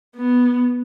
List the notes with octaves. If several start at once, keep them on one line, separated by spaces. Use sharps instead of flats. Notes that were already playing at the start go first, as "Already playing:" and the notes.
B3